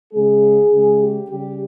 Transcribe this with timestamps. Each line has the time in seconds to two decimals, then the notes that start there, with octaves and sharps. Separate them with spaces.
0.13 C#3 G#3 G#4
0.72 C#3 G#3
1.01 G4
1.29 C#3 G3 G4